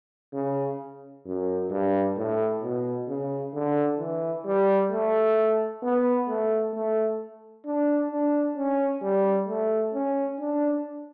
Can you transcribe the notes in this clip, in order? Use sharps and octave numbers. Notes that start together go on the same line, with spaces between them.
C#3
F#2
G2
A2
B2
C#3
D3
E3
G3
A3
B3
A3
A3
D4
D4
C#4
G3
A3
C#4
D4